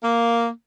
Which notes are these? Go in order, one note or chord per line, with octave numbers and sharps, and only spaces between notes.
A#3